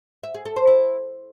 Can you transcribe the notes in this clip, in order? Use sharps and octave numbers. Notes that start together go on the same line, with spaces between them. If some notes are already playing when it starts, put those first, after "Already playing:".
E5
G#4
A4
C5
E4